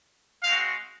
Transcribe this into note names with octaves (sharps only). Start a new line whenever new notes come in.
G#3 C4 F#4 F5